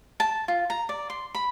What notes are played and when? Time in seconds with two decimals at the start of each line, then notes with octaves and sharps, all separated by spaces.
0.20 A5
0.48 F4
0.70 A#5
0.89 D5
1.10 C6
1.35 B5